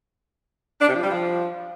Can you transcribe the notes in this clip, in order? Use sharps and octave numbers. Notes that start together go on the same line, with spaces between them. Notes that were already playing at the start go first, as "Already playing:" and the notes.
D4
C3
F3
G3
F3